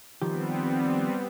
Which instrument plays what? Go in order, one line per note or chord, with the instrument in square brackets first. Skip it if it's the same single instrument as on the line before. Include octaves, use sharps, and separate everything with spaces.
[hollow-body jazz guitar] D#3 F3 G4 [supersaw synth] G3 B3 C4